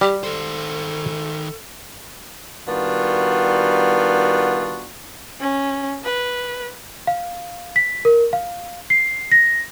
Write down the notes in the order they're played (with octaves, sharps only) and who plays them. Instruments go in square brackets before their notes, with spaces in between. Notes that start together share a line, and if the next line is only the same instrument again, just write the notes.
[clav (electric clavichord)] G3 [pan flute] G4
[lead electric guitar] D#3 C5 [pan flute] A4
[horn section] D#3 G3 B3 D4 F4 F#4
[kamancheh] C#4
B4
[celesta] F5
B6
A#4
F5
C7
A#6